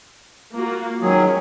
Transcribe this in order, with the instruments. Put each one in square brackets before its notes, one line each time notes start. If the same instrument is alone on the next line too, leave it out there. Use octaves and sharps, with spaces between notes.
[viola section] A#3 F4 F#4
[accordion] D#3 F#3 G#4 [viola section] G#3 C#4